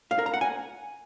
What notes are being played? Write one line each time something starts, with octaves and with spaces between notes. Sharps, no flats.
F5
A#4
A#5
F#5
G#5